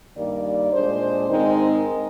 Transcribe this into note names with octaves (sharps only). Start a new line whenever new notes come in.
G2 D#3 G3 A#3 D5
A#2 G#3 D4 C5
G#2 D#3 G#3 C4 D#4 A#4